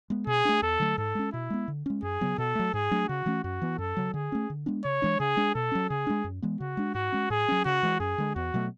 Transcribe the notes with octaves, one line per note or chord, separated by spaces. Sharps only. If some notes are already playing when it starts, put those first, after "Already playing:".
G#3 B3
B2 G#4
A3 D4
E2 A4
D3 F#3 A3
G#2 A4
G#3 C#4
B2 E4
G#3 B3
D3
G#3 C#4
F#2 G#4
C#3 F#3 B3
B2 A4
F#3 A3
G#2 G#4
F#3 A3 D4
C#3 F#4
E3 A3 C#4
F#2 F#4
E3 B3
F#2 A4
C#3 F#3
D3 G#4
A3 C#4
D3
G#3 B3 D4
C#3 C#5
E3 G#3 D4
C#3 G#4
G#3 D4
B2 A4
F#3 C#4
C#3 G#4
G#3 B3 D4
F#2
E3 G#3 B3
C#3 F#4
G#3 D4
G#2 F#4
G#3 C#4
A2 G#4
F#3 C#4
C#3 F#4
E3 G#3
F#2 G#4
D3 G#3
E2 F#4
B2 F#3 A3